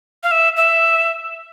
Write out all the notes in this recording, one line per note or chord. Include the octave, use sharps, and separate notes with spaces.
F5
E5
E5